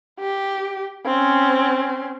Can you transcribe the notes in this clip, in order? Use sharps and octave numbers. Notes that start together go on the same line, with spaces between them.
G4
C4 C#4